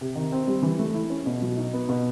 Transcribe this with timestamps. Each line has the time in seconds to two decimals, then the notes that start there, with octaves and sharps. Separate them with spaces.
0.01 C3
0.15 D#3
0.32 C4
0.47 G3
0.63 E3
0.79 A3
0.94 E4
1.10 C#4
1.26 B2
1.42 F#3
1.57 D#4
1.73 B3
1.89 B2